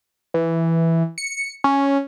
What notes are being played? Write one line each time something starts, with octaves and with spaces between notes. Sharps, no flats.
E3
C#7
C#4